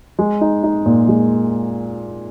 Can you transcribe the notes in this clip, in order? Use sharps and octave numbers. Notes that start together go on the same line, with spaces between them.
G#3
D#4
D#4
A#2
G#3